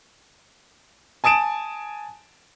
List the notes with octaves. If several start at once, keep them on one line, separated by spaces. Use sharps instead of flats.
G#5 A5 D#6 D7 E7